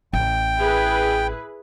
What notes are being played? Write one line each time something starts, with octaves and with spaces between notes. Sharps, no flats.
A1 G5
E4 G#4 B4